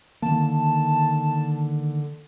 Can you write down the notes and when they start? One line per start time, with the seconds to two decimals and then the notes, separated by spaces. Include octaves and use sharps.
0.22 D3 D#3 A#3 A5